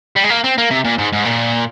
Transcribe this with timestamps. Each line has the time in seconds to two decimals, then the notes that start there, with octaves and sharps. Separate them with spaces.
0.16 G3
0.24 G#3
0.30 A#3
0.44 C4
0.58 A#3
0.70 C3
0.84 A#2
0.98 G#2
1.13 G#2
1.25 A#2